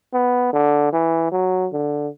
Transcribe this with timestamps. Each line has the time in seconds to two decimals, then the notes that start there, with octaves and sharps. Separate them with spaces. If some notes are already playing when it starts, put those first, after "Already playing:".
0.13 B3
0.53 D3
0.92 E3
1.32 F#3
1.73 D3